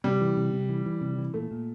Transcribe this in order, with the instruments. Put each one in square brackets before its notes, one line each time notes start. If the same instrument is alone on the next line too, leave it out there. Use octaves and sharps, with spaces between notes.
[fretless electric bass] C3 [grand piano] G3
[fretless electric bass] E3
C3
C3
E3
E3
C3
E3
[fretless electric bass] A#2 [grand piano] A3
[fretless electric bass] A#2